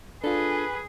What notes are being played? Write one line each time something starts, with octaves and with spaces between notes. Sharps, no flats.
D4 F4 G#4 A4 B4